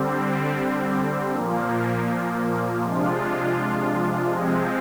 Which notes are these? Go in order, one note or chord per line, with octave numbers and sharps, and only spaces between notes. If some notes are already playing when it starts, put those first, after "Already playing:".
Already playing: D3 G3 C4
A#2 F3 A#3
C3 F3 G#3 D4 F4
C3 F3 G#3 C4